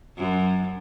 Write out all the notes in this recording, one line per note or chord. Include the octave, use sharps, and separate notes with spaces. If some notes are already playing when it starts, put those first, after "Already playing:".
F#2